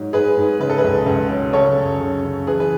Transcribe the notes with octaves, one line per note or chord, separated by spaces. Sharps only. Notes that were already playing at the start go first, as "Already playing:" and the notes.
Already playing: G#2 F#3
G#2 G#4 B4
G#2
C#3 B4
A4
G#4 B4
C#2
C#2
F#3
C#3 A4 C#5
F#2
C#3
C#3
E3 G#4 B4
B4